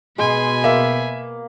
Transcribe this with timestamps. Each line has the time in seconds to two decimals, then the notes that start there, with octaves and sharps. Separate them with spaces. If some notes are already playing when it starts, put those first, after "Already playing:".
0.18 B2 G#3 G#5 B5
0.64 A#3 E5